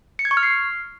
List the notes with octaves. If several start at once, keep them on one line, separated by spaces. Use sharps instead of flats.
C#7
G#6
C#6
F6
C7